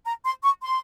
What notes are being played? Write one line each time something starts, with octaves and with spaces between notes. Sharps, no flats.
A#5
C6
C#6
C6